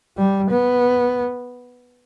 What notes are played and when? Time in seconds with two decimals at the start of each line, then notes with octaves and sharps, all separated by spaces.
0.17 G3
0.51 B3